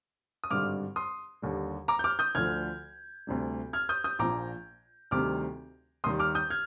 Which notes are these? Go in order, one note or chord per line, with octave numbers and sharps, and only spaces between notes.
D#6
G#1 G2 D3 G3 D6 F6
C6 D#6
D#2 D3 G3
A#5 D6
G6
D6 F6
D#6 G6
D2 D3 F3 F6 G#6
D2 C3 G3
F6 G#6
D#6 G6
D#6 G6
A#1 A#2 F3 A#5 D6
D2 C3 D#3 G3 D6 F6
D#2 D#3 G3 C6 D#6
D6 F6
D#6 G6
F6 G#6